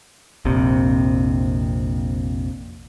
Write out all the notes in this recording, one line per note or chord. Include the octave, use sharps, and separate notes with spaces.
A#1 F2 C3